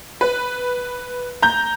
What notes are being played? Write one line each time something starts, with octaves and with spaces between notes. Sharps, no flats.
B4
A#5 G6